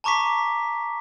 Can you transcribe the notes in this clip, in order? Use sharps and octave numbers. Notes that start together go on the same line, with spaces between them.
A5 A#5 C#6 D6 B6